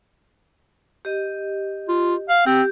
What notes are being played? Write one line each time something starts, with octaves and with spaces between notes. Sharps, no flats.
G4 D#5
F4
F5 F#5
C4 G4